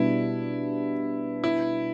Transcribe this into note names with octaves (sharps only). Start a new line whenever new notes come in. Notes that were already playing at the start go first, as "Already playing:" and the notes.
Already playing: B2 G3 B3 D4 E4
E4